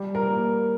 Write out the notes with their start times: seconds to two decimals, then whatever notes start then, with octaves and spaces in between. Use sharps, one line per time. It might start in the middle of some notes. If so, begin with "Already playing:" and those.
Already playing: G3
0.15 A#4
0.28 A#3